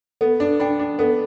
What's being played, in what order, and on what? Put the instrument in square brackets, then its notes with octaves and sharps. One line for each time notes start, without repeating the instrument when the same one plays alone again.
[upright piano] B3 [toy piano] A4
[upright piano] D4
[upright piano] D4 [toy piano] G5 B5
[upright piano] D4
[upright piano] B3 [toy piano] A4